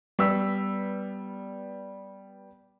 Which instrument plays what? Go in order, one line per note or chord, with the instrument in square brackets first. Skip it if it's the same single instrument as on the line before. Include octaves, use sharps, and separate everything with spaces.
[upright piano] G3 B3 E6 B6